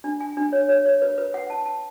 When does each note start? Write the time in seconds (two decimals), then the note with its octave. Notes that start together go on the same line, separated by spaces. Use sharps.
0.04 D4
0.20 G#5
0.37 D4
0.53 C#5
0.69 C#5
0.86 C#5
1.02 B4
1.18 B4
1.34 F#5
1.50 A5
1.66 A5